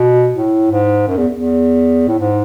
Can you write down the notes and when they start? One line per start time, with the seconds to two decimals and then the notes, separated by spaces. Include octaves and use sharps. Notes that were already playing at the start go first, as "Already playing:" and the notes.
Already playing: B2
0.34 A2
0.71 G#2
1.08 F#2
1.17 E2
1.35 E2
2.08 A2
2.19 G#2